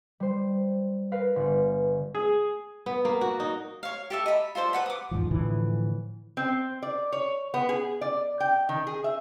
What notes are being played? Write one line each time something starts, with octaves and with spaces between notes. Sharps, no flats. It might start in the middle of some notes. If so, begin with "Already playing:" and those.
G3 C5
A#4 B4 F5
G1 D5
G#4
B3
A#3
F#4
D#4
C#5 F5
G4 A4 E5
D#5 B5
F4 A4 C5 D5
B4 F#5 B5
D6 D#6
E2 G#2 F3
A2 D3 E3 F3
C4
D5
C#5
B3
G#4
D5
G5
D#3
G#4
E5